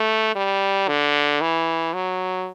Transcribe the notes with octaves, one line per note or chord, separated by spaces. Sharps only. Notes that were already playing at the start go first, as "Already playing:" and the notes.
Already playing: A3
G3
D3
E3
F#3